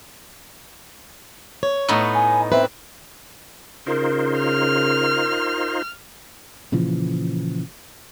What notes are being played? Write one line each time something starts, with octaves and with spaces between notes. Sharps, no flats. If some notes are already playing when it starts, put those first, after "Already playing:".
C#5
A2 B3 D#4
G#5
C4 B4 E5
C#3 D#4 F4 A#4 C5
F6
A#2 C#3 E3 F3